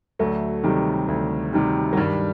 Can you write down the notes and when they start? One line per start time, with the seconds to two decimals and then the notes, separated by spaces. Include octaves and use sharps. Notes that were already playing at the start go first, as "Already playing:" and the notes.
0.19 D2 F#3 A3
0.64 C3 D#3 G3
1.08 D2
1.53 C3 D#3 G3
1.93 F#3
1.97 G2 D#3 G3